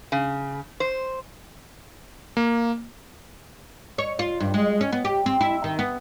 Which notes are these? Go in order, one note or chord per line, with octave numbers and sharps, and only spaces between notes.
C#3
C5
A#3
C#5
F4
G2
G#3
C#4
B3
G4
C4
E4
D#3
B3